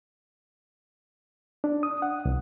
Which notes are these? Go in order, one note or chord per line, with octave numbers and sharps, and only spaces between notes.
D4
D#6
F#5
C2